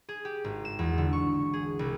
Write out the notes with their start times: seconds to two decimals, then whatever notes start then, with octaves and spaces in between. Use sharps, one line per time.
0.09 G#4
0.25 G4
0.44 G#1
0.65 E7
0.79 E2
0.98 D3
1.13 C#6
1.53 G#4
1.79 C2